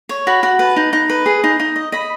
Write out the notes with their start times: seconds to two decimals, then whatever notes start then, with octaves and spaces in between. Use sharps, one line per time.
0.09 C#5
0.27 F#4 B5
0.43 F#4
0.59 B4 A5
0.76 D#4
0.93 D#4
1.10 B4
1.26 G#4
1.44 D#4
1.60 D#4
1.76 D#5
1.92 D#5 B5